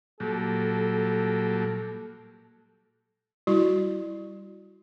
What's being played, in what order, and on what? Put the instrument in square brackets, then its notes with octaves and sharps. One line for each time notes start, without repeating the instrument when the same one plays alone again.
[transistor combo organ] A#2 F#3 G3 [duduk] A4
[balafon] G3 E4 F#4